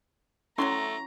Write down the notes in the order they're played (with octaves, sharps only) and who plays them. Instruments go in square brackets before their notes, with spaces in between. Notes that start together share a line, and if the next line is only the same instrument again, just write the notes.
[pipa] F#3 E5 C6 [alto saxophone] A3 [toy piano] C#4 E4 C#6 [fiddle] A#5